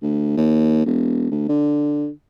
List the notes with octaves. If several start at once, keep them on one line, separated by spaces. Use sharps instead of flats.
D2
D#2
E1
D2
D3